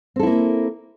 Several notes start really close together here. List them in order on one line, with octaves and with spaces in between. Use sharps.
C4 A4 E4 A#3